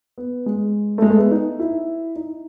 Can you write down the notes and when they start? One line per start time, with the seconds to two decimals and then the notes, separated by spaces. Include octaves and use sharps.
0.18 B3
0.46 G#3
0.98 A3
1.02 G#3
1.10 A3
1.17 B3
1.31 D#4
1.59 E4
2.16 D#4